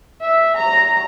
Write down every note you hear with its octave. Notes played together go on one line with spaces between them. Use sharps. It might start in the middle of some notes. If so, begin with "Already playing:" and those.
E5
A#5